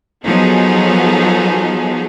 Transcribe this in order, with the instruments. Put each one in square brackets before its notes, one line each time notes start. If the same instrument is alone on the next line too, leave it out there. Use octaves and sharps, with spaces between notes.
[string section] F3 F#3 B3 D#4 G#4 A4